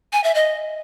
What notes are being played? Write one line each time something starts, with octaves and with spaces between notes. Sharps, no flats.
G#5
E5
D#5